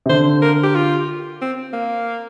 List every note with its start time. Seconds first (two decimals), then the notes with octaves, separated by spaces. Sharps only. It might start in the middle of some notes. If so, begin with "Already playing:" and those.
0.06 C3
0.09 D3 C5
0.42 A#4
0.63 G4
0.76 F4
1.42 C4
1.73 A#3